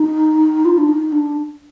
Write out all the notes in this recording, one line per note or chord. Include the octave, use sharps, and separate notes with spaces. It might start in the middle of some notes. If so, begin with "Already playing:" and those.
Already playing: D#4
F4
D4
D#4
D4